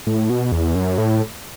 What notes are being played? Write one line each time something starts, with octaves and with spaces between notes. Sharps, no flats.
A2
B2
E2
F#2
A2